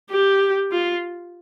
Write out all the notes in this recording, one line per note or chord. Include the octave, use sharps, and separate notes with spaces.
G4
F4